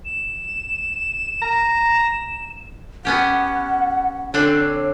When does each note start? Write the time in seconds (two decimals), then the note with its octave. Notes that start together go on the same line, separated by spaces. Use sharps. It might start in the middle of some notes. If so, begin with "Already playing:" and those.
0.05 E7
1.41 A#5
3.05 B3 C#4 G4 F#5
4.34 D3 C4 D4 C#5